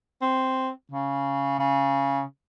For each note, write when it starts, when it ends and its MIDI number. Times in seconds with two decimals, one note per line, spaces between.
0.22 0.69 60
0.92 1.54 49
1.60 2.22 49